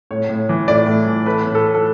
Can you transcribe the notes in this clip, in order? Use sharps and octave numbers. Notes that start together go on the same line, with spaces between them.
A2 C#5
A2
E3
A2 D5
A2
E3
A3 B4
A2
A4
A3
A4